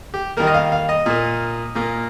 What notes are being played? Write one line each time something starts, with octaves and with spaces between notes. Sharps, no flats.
G4
D#3 G3 A#3 A#4
D#5
F5
F5
D#5
A#2 A#3
A#2 A#3